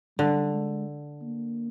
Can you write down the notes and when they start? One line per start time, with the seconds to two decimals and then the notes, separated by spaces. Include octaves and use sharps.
0.19 D3 G3
0.53 G#3
1.22 A#3